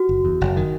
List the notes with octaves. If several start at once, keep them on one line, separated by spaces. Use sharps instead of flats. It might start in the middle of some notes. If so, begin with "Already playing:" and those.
Already playing: F#4
F#1
E2
F#1
D#3